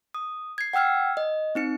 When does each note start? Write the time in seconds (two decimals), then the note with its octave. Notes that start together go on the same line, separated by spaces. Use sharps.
0.14 D#6
0.58 G#6 C7
0.73 F#5 G5 E6 F6 G#6
1.17 D#5
1.55 C4 D#4 C#7